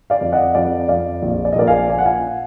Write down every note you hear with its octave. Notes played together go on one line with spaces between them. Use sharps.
D5 F5
F2
D#5 F#5
F2 D5 F5
F2 D5 F5
A#1
D5
D#5
A#1 A#4 D5
F5 G#5
A#2 G#5
F#5
F5 G#5